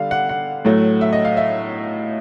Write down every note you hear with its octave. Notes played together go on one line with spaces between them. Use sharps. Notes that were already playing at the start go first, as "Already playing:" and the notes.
Already playing: D3 G3 F5
F#5
F#5
A2 F#3 A3
E5
D#5
F5
E5